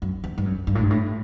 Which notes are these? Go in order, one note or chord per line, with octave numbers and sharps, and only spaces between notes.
F#2
E2
G2
F#2
G2
A2
G2
A2
A2